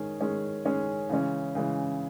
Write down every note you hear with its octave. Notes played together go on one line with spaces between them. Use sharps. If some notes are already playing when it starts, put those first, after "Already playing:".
Already playing: D#3 G#3 C#4 G#4
D#3 G#3 C#4 G#4
D#3 G#3 C#4 G#4
C#3 E3 G#3 C#4
C#3 E3 G#3 C#4